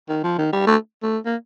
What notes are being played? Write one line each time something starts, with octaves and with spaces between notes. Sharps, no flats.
D#3
F3
D#3
G3
A3
A3
A#3